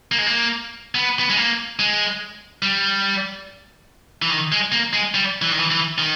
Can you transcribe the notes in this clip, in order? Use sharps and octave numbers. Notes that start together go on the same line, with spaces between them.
A#3
G#3
A#3
B3
B3
G#3
A#3
G#3
G3
E3
D#3
G#3
A#3
G#3
G3
E3
D#3
E3
E3
D#3